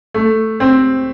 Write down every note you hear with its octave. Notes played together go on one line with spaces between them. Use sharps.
A3
C4